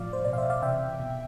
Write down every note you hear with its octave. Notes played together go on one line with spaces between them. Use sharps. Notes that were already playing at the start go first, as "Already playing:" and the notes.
Already playing: A2 F3 D5 F5
C5
B2 D5
F5
C5 E5
D5 F5
C3 E3 E5 G5
B2